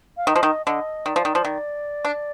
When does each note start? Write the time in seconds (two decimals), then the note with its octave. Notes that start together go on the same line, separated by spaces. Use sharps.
0.17 F5
0.27 D#3 D#5
0.36 F3
0.43 D#3
0.66 D3 D#5
1.06 D#3 D5
1.16 F3
1.25 D#3
1.35 F3
1.45 D#3
2.05 D4